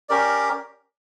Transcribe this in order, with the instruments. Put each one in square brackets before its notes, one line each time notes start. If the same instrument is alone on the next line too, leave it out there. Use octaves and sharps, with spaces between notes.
[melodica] C#4 G4 A#4 D5